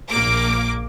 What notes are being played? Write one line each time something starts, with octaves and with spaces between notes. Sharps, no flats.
A#1 A#3 D6